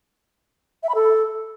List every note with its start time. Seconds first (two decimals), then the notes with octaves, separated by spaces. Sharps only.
0.83 E5
0.89 B5
0.95 A4